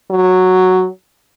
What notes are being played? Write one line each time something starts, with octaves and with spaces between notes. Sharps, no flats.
F#3